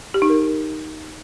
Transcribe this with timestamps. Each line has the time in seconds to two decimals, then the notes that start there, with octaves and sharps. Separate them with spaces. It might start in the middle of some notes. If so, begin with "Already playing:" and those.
0.14 G4
0.22 D#4
0.29 A#4